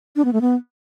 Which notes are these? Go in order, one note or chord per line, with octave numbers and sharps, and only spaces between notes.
D4
B3
A3
B3